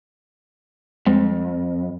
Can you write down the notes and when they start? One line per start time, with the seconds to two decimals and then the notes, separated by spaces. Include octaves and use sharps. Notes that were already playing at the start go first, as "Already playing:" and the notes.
1.06 F2 G3 G#3 C4